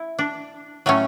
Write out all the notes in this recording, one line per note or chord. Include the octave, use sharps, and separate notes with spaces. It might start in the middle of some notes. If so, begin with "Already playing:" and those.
Already playing: E4
D4
A2 F#3 A3 C#4